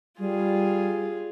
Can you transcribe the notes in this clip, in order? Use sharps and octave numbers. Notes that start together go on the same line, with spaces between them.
G3 F4 G#4